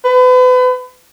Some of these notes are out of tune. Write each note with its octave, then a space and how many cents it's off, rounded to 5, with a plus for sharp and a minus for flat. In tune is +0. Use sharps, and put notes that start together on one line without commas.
B4 +35